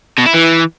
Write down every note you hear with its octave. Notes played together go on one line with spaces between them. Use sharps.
B2
E4
E3